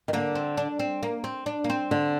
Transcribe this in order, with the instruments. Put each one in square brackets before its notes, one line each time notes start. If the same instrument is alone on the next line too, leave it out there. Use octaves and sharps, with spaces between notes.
[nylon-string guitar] D#3
[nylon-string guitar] D3 [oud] A#3
[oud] C4
D4
C4
A#3
C4
D4
A#3
C4
[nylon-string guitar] D3